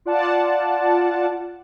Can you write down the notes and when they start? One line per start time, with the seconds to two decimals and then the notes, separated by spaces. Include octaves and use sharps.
0.05 F4 D5 F#5 A5